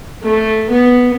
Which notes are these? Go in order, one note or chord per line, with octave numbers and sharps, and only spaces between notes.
A3
B3